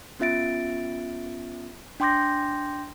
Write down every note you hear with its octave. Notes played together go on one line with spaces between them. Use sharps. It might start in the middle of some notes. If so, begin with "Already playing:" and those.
B3 C#4 F4 E5 A6 D7
D4 G5 C6 D6 G6 A#6